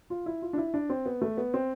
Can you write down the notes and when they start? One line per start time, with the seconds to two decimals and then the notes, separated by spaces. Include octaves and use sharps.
0.10 F4
0.26 E4
0.42 F4
0.53 D4
0.58 E4
0.74 D4
0.90 C4
1.06 B3
1.21 A3
1.37 B3
1.54 C4